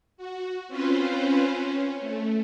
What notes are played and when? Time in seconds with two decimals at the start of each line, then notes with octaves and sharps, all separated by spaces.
0.17 F#4
0.68 C4 C#4 F4 B4 C5
1.49 C#4
2.01 A3